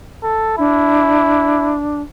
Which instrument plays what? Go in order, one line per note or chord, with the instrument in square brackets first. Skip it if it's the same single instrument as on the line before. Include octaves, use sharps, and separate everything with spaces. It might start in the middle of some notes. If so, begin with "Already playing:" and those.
[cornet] A4
[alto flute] D4 [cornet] E4